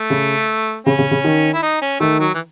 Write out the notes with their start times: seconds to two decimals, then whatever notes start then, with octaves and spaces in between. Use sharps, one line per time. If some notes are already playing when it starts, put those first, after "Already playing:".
Already playing: A3
0.10 C#3
0.86 C#3 C#4
0.99 C#3
1.11 C#3
1.24 D#3
1.54 E4
1.62 D#4
1.81 C#4
2.00 D#3 A3
2.20 F#3
2.34 E3